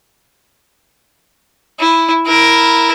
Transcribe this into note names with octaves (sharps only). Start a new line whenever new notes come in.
E4
E4 A#4